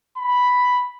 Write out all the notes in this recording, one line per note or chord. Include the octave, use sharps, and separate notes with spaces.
B5